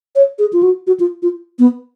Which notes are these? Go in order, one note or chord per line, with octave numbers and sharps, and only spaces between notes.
C#5
G#4
F4
F#4
F#4
F4
F4
B3